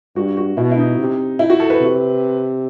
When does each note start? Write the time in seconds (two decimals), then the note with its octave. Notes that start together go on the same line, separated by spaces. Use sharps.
0.16 G2 F#4
0.37 F#4
0.57 B2 E4
0.71 E4
0.77 D#4
0.98 C3
1.39 E4
1.50 F#4
1.60 A4
1.70 B4
1.80 C3